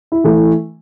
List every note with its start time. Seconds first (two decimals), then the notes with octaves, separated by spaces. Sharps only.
0.12 E4
0.24 E3 A3